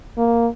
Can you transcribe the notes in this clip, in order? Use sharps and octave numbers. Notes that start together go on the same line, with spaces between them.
A#3